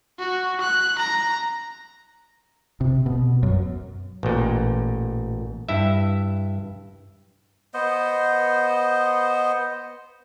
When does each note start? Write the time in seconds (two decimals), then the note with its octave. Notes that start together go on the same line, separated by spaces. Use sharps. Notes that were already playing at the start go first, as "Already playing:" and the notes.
0.19 F#4
0.61 F#6
0.99 A#5
2.81 C3
3.06 B2
3.43 F#2
4.23 A1 A#2
5.69 G2 E4 E5
7.74 B3 C5 D#5